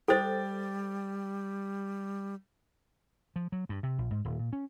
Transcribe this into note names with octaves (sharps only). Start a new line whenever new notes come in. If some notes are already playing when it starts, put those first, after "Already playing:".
G3 A4 C5 G5 A6
F3
F#3
G2
C3
A#1
G#2
D#1
A#2
C#4